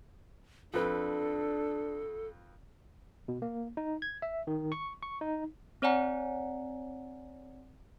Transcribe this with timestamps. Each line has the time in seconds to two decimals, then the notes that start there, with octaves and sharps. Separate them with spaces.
0.74 F2 D4 A4 B4
3.28 B2
3.42 A#3
3.77 D#4
4.02 G#6
4.22 E5
4.47 D#3
4.72 C#6
5.03 C#6
5.21 D#4
5.82 C4 C#5 D5 F#5 G#5 A#5